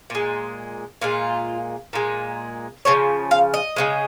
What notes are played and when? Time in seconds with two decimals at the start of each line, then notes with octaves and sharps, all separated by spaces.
0.10 A#2 G#3
1.01 A#2 G#3 F4
1.93 A#2 G#3
2.85 C#3 F3 C#5
3.31 F5
3.54 D#5
3.76 C#3 F3 G#3